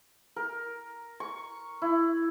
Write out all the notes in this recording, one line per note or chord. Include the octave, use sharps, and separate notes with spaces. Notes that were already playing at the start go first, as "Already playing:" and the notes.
A#4
C#6
E4